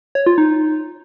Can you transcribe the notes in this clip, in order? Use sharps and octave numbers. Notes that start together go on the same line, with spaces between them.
C#5
F4
D#4